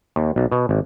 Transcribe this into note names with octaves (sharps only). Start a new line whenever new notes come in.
D#2
B1
B2
G#1